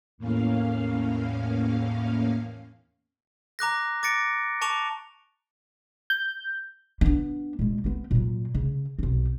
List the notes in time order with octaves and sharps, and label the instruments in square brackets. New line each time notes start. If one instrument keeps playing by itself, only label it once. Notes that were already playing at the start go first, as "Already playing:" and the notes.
[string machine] E2 A2 A#3 C#4 F5
[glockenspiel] A#5 D6 F#6 A#6
D6 A6 A#6 C#7 D7
A5 C#6 D6 F7
[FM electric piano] G6
[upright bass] B3 D4
A#2 G#3
B3 C4
A#2 F#3
C#3
B1 C4